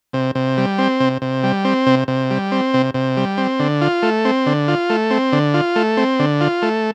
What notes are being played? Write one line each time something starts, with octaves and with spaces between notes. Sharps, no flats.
C3
C3
G3
C4
C3
C3
G3
C4
C3
C3
G3
C4
C3
C3
G3
C4
D3
F4
A3
C4
D3
F4
A3
C4
D3
F4
A3
C4
D3
F4
A3